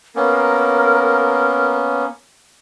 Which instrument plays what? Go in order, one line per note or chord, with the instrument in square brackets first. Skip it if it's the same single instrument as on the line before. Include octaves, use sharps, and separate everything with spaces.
[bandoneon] A#3 B3 C#4 [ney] A#4